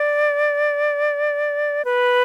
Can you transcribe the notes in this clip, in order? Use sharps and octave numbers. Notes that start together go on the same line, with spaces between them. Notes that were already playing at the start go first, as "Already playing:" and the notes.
Already playing: D5
B4